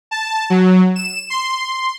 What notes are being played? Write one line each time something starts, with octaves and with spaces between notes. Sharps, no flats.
A5
F#3
E7
C6